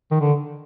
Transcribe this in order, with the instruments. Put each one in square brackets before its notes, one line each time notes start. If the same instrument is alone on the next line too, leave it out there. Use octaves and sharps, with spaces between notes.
[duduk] D#3
D3